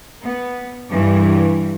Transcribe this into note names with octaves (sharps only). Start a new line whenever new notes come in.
B3
G2 E3 G3